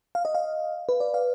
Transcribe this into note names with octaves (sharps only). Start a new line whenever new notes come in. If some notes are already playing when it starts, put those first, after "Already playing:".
F5
D#5
F5
B4
D5
F5